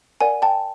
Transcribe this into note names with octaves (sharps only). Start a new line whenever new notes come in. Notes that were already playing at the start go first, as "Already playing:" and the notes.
A#4 D5 F#5 G#5
G5 A5